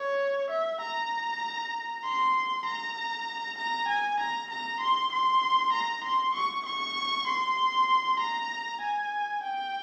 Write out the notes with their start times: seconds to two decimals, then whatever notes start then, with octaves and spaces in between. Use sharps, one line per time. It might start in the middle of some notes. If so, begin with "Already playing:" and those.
Already playing: C#5
0.50 E5
0.81 A#5
2.04 C6
2.65 A#5
3.58 A#5
3.88 G#5
4.20 A#5
4.51 A#5
4.80 C6
5.12 C6
5.73 A#5
6.04 C6
6.35 C#6
6.66 C#6
7.27 C6
8.19 A#5
8.81 G#5
9.43 G5